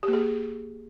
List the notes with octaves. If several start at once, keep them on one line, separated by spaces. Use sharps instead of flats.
G4
A#3
G#4